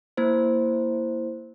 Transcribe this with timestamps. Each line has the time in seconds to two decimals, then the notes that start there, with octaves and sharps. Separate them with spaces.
0.17 A#3 E4 C5